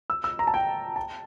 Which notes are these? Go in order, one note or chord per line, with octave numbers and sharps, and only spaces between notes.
E6
E6
A#5
A5
G5
A5